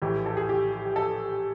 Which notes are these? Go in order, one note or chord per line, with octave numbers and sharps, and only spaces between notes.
A#1 A2 E3 G4
A4
G#4
G4
A4